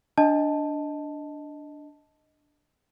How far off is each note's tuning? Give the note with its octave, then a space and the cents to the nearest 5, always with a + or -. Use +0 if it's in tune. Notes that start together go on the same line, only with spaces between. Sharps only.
D4 +0 D#5 +5 A5 +0